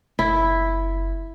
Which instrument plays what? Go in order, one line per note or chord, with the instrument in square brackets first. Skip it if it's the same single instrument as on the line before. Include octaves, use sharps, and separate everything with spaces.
[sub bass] F#1 [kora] E4